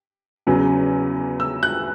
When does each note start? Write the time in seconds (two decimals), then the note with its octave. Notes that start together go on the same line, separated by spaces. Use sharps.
0.47 E2 C#3 F#3 C#4
1.40 E6
1.63 F#6